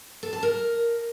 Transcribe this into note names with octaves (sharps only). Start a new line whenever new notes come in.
A4
A5
A#4